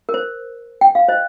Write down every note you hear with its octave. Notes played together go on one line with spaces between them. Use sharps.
A#4
C5
G5
F5
C5 D#5